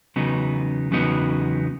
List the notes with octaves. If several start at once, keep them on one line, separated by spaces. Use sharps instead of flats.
E2 C#3 F#3 B3 D#4
E2 C#3 F#3 B3 D#4